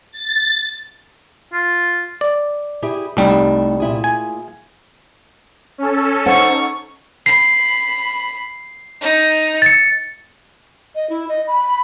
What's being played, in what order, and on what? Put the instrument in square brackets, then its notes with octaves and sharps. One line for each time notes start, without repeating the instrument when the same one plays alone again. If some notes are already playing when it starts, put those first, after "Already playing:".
[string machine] A6
[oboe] F4
[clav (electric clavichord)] D5
[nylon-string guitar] E4 G4 G#4
[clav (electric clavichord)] C2 G3 [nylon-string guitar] A3 D#4
[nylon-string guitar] A#2 E4 G#4
[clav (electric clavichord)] G#5
[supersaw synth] C#4 A4
[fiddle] D#4 C#6 [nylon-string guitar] C5 F#5
[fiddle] B5 [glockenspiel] C7
[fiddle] D#4
[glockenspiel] A6 C#7
[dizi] D#5
E4
D#5
B5